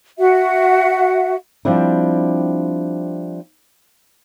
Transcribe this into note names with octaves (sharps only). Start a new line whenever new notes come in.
F#4 E5 F#5
F3 G3 C4 D4 E4